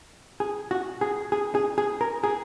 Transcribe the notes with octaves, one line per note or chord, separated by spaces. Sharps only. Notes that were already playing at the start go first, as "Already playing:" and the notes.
G#4
F#4
G#4
G#4
G#4
G#4
A#4
G#4